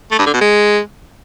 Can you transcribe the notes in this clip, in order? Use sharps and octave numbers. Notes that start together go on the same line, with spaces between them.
A3
G2
D3
B2
G#3